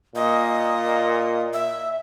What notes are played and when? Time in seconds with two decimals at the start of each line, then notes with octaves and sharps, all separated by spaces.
0.15 A#2 D#5
1.53 E5